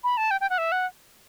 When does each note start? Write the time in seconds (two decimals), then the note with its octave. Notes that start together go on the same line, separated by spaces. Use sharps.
0.04 B5
0.17 A5
0.31 G5
0.41 G5
0.50 F#5
0.58 E5
0.72 F#5